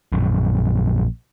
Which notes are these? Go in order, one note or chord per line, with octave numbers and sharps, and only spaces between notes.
A#1 F#2